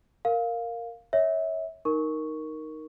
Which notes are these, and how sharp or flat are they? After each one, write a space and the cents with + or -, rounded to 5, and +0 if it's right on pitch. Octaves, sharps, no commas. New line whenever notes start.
A#4 -5 F5 +5
C#5 +0 E5 -25
D#4 +0 A#4 +5 C#6 +0